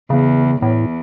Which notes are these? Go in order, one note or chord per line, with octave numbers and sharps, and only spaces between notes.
E2 C#3
E2 A2